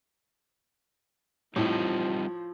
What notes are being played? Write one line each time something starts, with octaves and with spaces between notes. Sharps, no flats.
A2 F3 G3 C4 D#4